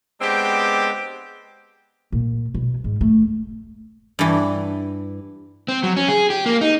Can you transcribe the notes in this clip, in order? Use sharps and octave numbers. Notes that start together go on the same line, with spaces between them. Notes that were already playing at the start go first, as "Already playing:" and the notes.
G#3 B3 C4 D4 G4
A#2
B2
G#2
A3
G2 E3
C4
F#3
C#4
G#4
G4
A#3
D#4